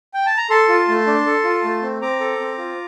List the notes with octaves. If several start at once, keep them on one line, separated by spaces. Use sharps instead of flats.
G5
A5
A#5
A4 A5 C6
F4
A3
D4
A4
F4
A3
C4
C4 A#5 D6
A4
C4
F4